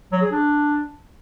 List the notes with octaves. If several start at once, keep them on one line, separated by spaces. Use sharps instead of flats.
F#3
G#4
D4